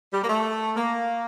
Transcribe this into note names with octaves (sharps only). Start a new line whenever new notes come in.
G3
A#3
A3
A#3